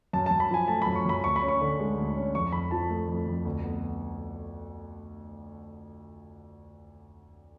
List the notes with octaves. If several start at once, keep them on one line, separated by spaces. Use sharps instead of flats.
F#2 A5
A5
F#2
B5
F3 G#5
A3 A5
B5
F#2
C#6
F#2 B5
D2 C#6
B5
C#4
C#6
D3
G#3
D2
C#4
F2 C#6
F2 B5
F3 A5
A3
F2
F2
D2
B3